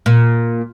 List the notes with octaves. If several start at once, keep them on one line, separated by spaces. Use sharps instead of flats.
A#2